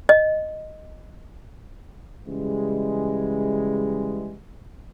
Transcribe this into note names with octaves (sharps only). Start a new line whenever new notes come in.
D#5
C#3 E3 G3 G#3